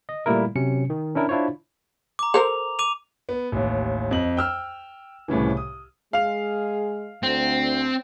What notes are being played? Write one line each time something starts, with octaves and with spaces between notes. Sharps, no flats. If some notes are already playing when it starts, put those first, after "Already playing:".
D#5
A#2 G3 A3 A#3 E4 A#4
C3 F#3 C#4 C#7
D#3
C#4 D4 E4 A#4
D4 E4 F4 C5 C#5
A#5 D6
A4 A#4 C5 F7
D6 D#7 F7
B3
A1 D#2
F2 D#5 F#7
G5 E6 F6
C2 A2 C#3 E3
D#6
G#3 G#4 F5 F7
D2 C4